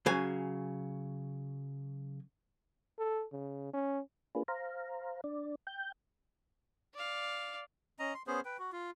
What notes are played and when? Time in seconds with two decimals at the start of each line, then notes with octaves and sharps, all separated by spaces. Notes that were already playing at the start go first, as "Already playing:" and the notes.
0.06 C#3 F#3 G#5
2.99 A4
3.32 C#3
3.74 C#4
4.35 A#3 D4 F4 G#4 B4
4.48 C5 F5 A#5
5.24 D4 D5
5.67 G5 G6
6.94 D5 F5
7.99 C#4 D#5 A#5
8.14 C6
8.27 B3 C#4 G#4 C5
8.45 B4 G5
8.59 F#4
8.73 F4